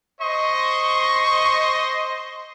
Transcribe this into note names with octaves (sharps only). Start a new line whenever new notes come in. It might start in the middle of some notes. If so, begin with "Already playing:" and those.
C5 D#5 C#6